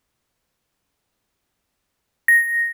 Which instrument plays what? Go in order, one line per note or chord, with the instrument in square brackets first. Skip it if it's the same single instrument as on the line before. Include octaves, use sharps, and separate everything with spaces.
[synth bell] A#6